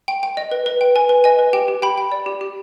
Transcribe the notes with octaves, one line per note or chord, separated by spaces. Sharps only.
G5
G5
D#5
B4
B4
G5
B4 G#5
B4
D#5 G#5
B4
G4 G5
G4
G4 G5 B5
G5
D5
G4
G4